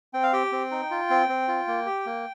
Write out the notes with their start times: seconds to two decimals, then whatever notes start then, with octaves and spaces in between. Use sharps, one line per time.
0.14 C4 G5
0.23 F5
0.33 G4 G5
0.52 C4
0.71 D#4
0.91 F4
1.10 C4
1.29 C4
1.48 F4
1.68 A#3
1.86 G4
2.06 A#3